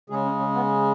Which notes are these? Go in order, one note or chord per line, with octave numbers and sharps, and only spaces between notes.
C#3 G#3 G#4
C#4
C#4
B3